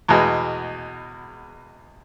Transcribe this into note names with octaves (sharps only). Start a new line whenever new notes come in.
E2 B2 G#3